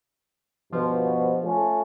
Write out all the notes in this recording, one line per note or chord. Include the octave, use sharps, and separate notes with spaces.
G2 B2 F3
A3 C#4 F4